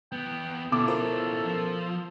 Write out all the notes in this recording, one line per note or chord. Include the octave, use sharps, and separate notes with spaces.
E2 B3 G5
B2 C#4 E4 A4 D6
F4 A#4 C5
F3